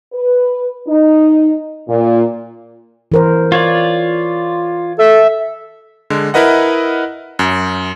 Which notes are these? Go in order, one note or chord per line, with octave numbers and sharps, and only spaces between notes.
B4
D#4
A#2
E3 A#4 C5
F4 C#5 D5
A4 E5
D3 G#3
E4 A#4 B4 D#5 F#5
F#2